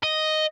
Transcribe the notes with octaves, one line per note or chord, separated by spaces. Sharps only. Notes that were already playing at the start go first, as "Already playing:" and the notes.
D#5